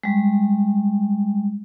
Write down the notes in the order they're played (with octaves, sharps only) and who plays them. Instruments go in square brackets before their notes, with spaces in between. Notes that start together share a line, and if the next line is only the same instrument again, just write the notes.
[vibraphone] G3 G#3